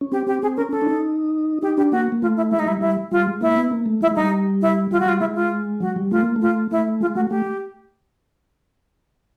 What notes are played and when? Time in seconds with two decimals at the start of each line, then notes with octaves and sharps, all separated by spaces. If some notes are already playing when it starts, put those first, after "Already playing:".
0.01 C#4
0.12 C4 G4
0.27 C4 G4
0.42 C4 G#4
0.57 C#4 A#4
0.72 C#4 A4
0.82 D4
0.87 D#4
1.62 D#4 G4
1.77 D4 G4
1.92 A#3 F#4
2.12 A#3
2.22 A3 F4
2.37 E4
2.51 G#3 E4
2.59 D#4
2.66 G3 E4
2.81 G3 E4
3.12 G3 F4
3.27 G#3
3.41 A#3 E4
3.56 B3
3.71 A#3
3.86 A3
4.01 G#3 E4
4.11 G#3
4.16 G3 D#4
4.62 E4
4.91 G3 F4
5.00 F#4
5.06 G3 F4
5.20 G#3 E4
5.35 F4
5.80 F#3 F#4
5.96 G3
6.11 A3 F4
6.23 A#3
6.36 A3
6.41 F4
6.71 A3 E4
7.01 G#3 F4
7.15 A3 F#4
7.30 A3 G4